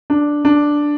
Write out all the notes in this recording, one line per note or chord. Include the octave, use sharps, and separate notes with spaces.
D4
D4